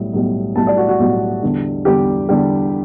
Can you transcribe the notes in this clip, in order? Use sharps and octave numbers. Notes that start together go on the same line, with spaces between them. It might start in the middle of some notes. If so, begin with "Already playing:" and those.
Already playing: B1 A2 G3
B1 A2 G3
B1 A2 G3 A5
D5
F#4
F#4
B1 A2 G3
E2 D3 G3
E2 D3 G3 G4
E2 D3 G3